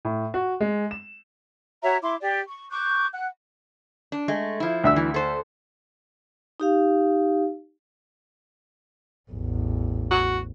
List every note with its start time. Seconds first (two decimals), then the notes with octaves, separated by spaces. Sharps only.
0.05 A2
0.34 F#4
0.61 G#3
0.91 E7
1.82 F#4 C#5 E5 A#5
2.02 E4 C6 D6
2.21 G4 D5
2.48 C#6
2.70 C#6 D6 F#6 G6
3.12 F#5 F#6
4.12 D4
4.28 G#3 A3
4.60 F3 E4
4.84 D2 E5 E6
4.96 E3
5.14 A4 C5
6.60 D#4 G4 F5
9.31 A1 E2
10.11 F#4